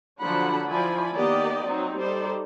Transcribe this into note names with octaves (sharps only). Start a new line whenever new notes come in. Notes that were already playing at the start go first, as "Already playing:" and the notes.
D3 F3 F#3 D4 F#5 B5
F3 E4 D5 G#5 B5
D#3 A#3 B3 G4 D5 D#5
F#3 C4 D#4
G3 D#4 G4 A4 C5 D5